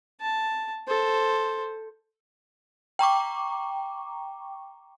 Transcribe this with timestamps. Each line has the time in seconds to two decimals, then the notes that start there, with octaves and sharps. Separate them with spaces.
0.21 A5
0.88 A4 C5
2.99 G5 A#5 C#6 D6